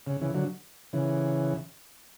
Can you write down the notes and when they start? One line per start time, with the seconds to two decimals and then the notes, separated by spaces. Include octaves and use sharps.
0.07 C#3
0.21 C#3 E3
0.35 D3 F#3
0.93 C#3 E3